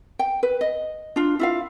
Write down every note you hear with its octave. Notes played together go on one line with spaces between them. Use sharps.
G5
B4
D#5
D4 F4
E4 F4 F5